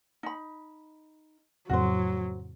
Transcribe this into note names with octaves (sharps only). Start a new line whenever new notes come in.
D#4 B5
F2 A2 C#3 F#3 F#4 C5